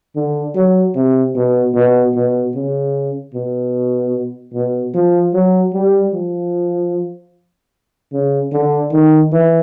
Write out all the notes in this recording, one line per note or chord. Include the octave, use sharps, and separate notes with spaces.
D3
F#3
C3
B2
B2
B2
C#3
B2
B2
F3
F#3
G3
F3
C#3
D3
D#3
E3